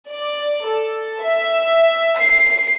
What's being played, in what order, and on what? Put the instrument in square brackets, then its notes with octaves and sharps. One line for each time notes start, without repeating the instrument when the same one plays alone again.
[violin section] D5
A4
E5
C7